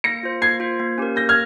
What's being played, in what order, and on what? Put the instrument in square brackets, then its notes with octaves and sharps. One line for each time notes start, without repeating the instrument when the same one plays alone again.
[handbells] A#3 [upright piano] A#6 C#7
[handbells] F4 C5
[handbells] A#3 [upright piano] G#6 C7
[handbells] F4 C5
A#3
C#4 G4 A#4
[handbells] A#3 [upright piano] G6 A#6
[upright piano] F6 G#6